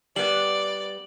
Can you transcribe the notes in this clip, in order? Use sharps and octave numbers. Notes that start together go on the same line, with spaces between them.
G3 B3 D5 F#7